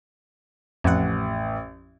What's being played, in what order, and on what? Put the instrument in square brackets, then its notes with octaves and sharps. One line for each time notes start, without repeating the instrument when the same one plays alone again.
[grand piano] A1 [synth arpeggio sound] F2 F#5